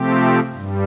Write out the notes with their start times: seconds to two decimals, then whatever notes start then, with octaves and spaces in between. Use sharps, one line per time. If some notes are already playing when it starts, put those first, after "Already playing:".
Already playing: C3 F3 A3 C4 G4
0.53 G2 G3